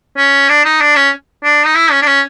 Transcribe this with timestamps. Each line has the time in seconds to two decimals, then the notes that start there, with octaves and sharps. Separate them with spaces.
0.18 C#4
0.49 D4
0.65 D#4
0.81 D4
0.96 C#4
1.44 D4
1.66 D#4
1.75 E4
1.91 C#4
2.02 D4
2.07 C#4